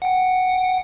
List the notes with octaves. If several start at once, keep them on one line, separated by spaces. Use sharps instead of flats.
F#5 G5